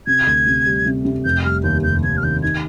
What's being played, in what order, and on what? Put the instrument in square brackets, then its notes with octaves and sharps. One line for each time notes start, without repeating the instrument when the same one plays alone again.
[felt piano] C3 [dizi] G#6
[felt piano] D2
C3
G3
C3
C3
[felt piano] F1 [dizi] G6
[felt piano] G3 [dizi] F6
[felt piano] D#2 [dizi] G6
[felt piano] F1 [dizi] G6
[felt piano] F1 [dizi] G#6
[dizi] F6
[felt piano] D#3 [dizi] G6
[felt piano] D#4 [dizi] G#6